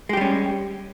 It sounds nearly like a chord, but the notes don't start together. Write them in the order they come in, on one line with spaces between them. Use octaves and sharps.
G#3 G4 G3 C#4